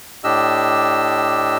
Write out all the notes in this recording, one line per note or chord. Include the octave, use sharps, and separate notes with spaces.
A2 D4 G4 D#5 E6